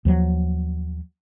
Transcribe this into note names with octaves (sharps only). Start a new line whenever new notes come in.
D#2 F3 F#3